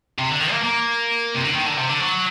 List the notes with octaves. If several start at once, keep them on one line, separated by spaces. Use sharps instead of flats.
C3
D3
D#3
A#3
A#3
C3
D3
D#3
D3
C3
D3
F#3